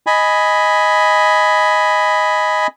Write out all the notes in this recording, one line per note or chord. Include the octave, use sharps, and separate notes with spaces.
D#5 G#5 B5